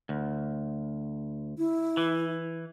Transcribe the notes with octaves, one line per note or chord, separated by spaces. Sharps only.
D2
E4
E3